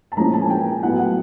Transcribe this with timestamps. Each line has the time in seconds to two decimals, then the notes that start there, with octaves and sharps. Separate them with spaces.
0.12 A5
0.17 A#2 F3 G#3 C#4 E4 A#5
0.34 A5
0.41 G#5
0.50 G5
0.83 A2 F#3 B3 E4 F#5
0.99 F#5